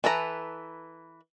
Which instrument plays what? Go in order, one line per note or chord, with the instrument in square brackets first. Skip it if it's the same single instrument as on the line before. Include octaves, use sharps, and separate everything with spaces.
[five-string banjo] E3 A4 B4 A#5